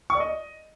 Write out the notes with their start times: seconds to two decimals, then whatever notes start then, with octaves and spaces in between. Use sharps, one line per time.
0.10 C#6
0.15 D5
0.20 D#5